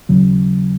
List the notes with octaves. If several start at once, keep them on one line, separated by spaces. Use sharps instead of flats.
D#2 C#3 F#3